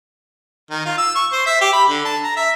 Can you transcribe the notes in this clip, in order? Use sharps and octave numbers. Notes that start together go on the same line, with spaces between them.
D#3
F4
E6
C#6
C5
E5
G4
B5
D3
A5
A#5
E5